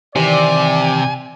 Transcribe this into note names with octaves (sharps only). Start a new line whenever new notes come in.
C3 D#3 E3 G4 D5 G#5